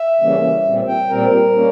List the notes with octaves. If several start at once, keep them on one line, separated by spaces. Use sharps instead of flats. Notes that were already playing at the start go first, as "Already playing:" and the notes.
Already playing: E5
C#3 E3 G3 A#3 C#4
A#2 G3 C4
G5
A#2 G3 C4 A#4
G3 A#3 C#4